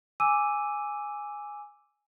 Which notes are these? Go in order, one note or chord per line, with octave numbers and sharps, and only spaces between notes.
G#5 D6 E6 D#7